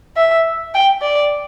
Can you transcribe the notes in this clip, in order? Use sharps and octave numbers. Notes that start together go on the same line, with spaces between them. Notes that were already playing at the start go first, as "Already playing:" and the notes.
E5
G5
D5